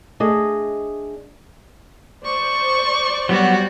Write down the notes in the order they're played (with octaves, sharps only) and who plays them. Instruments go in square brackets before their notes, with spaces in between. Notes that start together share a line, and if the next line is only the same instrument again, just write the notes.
[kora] A3 D4 G#4 D#5
[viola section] C5 D5 [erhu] C#6
[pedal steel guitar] F#3 B3 [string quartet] G3 F#4